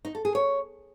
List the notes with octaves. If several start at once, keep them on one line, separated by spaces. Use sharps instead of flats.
D#4
A4
G#4
C#5